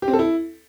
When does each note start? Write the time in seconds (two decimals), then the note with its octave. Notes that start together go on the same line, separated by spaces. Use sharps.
0.02 G4
0.08 C4
0.13 A4
0.19 E4